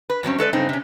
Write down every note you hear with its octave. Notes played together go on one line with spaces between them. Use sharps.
B4
G2 F#3 C4 C#4
G#3 A4 B4 D5
G2 C#3 C4 D#4
C3 C#4